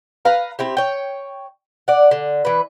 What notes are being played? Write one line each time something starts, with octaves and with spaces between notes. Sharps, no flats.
B4 F5 A#5
C4 E4 G4
C#5 G5
D5 F#5
D3
E3 B4